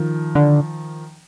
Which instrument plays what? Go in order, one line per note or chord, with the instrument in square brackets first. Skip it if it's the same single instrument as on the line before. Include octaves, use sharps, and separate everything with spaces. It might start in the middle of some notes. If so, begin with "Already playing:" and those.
Already playing: [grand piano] D#3 F3
[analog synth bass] D3